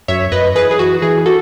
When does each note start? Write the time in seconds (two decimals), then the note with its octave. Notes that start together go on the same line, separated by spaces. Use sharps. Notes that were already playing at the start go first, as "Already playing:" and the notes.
0.08 F#2 C#5 E5
0.32 F#2 B4 D#5
0.55 E3 G#4 B4
0.71 G#4
0.79 E3 F#4
1.02 E3 G#4
1.26 F#4 A4